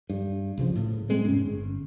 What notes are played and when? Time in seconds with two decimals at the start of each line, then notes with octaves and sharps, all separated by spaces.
0.10 G2
0.58 C2 C#3 F3
0.75 A2
1.09 G3 G#3 C4
1.25 F1 G#2 C#4
1.46 G1